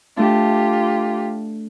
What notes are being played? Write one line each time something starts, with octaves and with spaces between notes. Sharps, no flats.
A3 D4 F4 G4